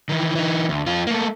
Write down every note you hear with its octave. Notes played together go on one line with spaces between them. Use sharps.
D#3 E3
E3 D#4
D2
F2 F4
A3 A#3